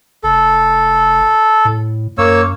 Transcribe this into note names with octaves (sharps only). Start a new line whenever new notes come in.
F1 A4
A2
F#2 A#3 C#5 E6